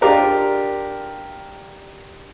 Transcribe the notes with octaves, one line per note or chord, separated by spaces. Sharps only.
D4 F4 G4 A#4 D#5